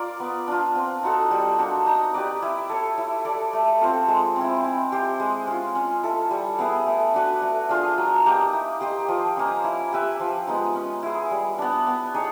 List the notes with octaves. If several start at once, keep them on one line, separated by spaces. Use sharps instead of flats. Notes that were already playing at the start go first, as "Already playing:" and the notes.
Already playing: F4 A#4 D5
B3
D4 F4
C4
D#4 F#4 A4
G3
A#3 D4 F#4
D#4
G4 B4 D5
E4
A4 C#5
E4
A4 D5
A3
C4 F4 A4
G#3
C4
E4
E4
G4 C5
G#3
C#4 F4
C#4
E4 A4
G3
B3 E4 G#4
A3
D4 F#4 B4
A3
D4 F4 G#4
F#3
A#3 D#4 G4
E4
G4 C5 D#5
F3
A#3 C#4
E4
G4 B4 E5
F3
G#3 B3 D#4
C#4
E4 G#4
G3
B3 D4
B3
D#4 G#4 C#5